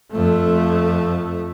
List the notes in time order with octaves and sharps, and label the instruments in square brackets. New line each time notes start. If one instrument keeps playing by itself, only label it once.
[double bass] F2 A3